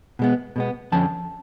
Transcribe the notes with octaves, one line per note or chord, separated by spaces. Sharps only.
B2 G#3 B3
B2 G#3 B3
F2 D3 F3 C#4 A5